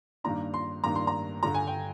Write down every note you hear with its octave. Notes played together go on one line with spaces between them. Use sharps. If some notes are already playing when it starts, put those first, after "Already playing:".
G2 D#3 A#3 D4 A#5
C6
G2 D#3 A#3 D4 A#5
C6
A#5
G2 D3 G3 A#5
G#5
G5